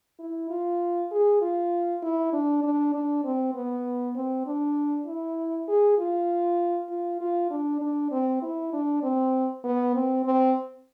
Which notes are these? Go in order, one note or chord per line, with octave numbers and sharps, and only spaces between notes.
E4
F4
G#4
F4
E4
D4
D4
D4
C4
B3
C4
D4
E4
G#4
F4
F4
F4
D4
D4
C4
E4
D4
C4
B3
C4
C4